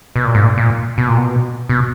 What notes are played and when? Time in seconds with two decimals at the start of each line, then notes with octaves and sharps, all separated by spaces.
0.16 B2
0.25 A#2
0.35 G#2
0.44 A#2
0.58 A#2
0.98 B2
1.08 A#2
1.17 B2
1.69 B2